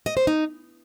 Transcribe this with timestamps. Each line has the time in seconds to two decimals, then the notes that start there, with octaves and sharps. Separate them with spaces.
0.06 D#5
0.17 C5
0.27 D#4